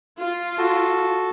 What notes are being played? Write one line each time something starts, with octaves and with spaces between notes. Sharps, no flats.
F4
F#4 A4 A5